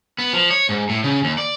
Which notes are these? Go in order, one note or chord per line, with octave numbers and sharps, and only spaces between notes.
B3
F3
C#5
G#2
A2
C#3
D#2
D5